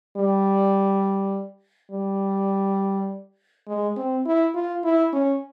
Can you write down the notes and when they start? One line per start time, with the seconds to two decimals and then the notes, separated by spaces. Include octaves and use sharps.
0.17 G3
1.91 G3
3.67 G#3
3.96 C4
4.25 E4
4.55 F4
4.84 E4
5.13 C#4